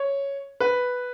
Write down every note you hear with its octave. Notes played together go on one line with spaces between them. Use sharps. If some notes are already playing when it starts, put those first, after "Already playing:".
Already playing: C#5
B4